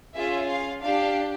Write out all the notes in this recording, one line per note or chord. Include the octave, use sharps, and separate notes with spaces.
C#4 F4 G#4 E5
F5
D4 G4 F5